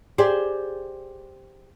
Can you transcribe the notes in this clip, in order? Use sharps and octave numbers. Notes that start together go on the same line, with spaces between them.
G4 G#4 C5 D5